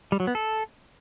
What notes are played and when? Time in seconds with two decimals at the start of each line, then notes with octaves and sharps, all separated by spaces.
0.12 G3
0.20 F#3
0.27 B3
0.35 A4